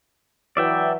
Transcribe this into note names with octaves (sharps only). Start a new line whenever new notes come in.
E3 F#3 D5 E5 G5